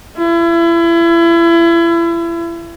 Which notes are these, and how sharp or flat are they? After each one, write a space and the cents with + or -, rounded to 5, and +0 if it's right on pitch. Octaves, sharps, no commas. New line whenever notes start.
E4 +35